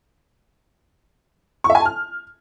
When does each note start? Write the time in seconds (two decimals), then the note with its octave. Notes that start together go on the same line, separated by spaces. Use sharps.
1.64 C#6
1.70 E5
1.75 G#5
1.80 A5
1.85 F6